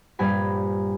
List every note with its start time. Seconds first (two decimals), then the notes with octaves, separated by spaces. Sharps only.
0.19 A#1 G2 G4 G#5 B5